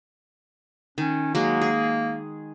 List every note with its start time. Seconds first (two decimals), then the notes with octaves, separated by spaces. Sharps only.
0.98 D#3 C#4
1.35 F#3 G#3 A#3
1.61 G#4